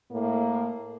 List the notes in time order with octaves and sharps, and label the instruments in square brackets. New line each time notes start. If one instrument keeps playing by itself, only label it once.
[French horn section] A2 A#3